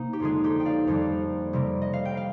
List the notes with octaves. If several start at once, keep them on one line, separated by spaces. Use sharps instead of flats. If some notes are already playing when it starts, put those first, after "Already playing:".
Already playing: C3 A#3 D#4
G4
F2 D3 G#3 F4 G#4
D#4 G4
G5
D5 F5
F2 D#3 G3 A#3
C3 G3 A#3
D#5
F5
G5
F5